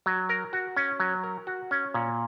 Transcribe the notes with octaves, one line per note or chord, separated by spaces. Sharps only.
F#3
A#4
F#4
C#4
F#3
A#4
F#4
C#4
A#2